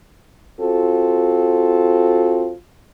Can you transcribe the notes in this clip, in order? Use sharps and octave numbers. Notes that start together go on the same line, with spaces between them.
C4 F4 F#4 A4